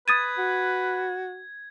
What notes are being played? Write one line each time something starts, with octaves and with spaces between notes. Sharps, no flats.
B4 D#6 G#6 A6 D#7
F#4